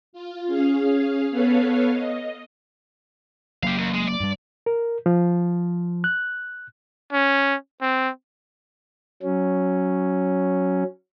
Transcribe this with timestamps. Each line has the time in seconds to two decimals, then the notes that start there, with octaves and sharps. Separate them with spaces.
0.13 F4
0.47 C#4 G#4 F5
1.31 B3 A4 B4 C#5 F5
1.92 D#5
3.63 F#3 A#3 G4 F5
3.78 D#2
3.94 G#3
4.08 D5
4.20 G2 G3
4.66 A#4
5.06 F3
6.04 F#6
7.13 C#4
7.81 C4
9.22 F#3 C#4